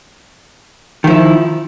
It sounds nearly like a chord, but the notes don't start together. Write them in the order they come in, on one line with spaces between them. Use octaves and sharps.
D#3 F3 E4